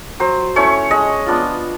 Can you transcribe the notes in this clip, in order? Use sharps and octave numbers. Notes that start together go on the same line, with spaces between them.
F#3 C5
A3 C#4 E4 C#5
G#3 D#5
B3 D4 F4